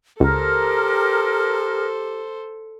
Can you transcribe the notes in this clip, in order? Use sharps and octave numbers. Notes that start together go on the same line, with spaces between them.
C#2 G4 A4 A#4 C5